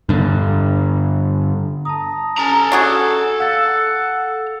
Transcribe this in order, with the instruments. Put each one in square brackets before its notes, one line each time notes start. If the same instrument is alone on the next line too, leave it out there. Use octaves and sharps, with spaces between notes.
[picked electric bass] G2 D3
[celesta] A5 D#6 [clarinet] A#5
[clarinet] C#4 [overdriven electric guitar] A4 A#5
[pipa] D4 F#4 G#4
[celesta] F5 E6 A6 [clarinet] F#5